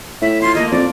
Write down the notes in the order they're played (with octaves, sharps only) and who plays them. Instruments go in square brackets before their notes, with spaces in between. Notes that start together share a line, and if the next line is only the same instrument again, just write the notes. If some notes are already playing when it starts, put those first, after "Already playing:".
[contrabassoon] A2 [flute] E5
[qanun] E4 F4 [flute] C6
[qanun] A3 A#3 A#4 [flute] D#5
[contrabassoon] F2 [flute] D5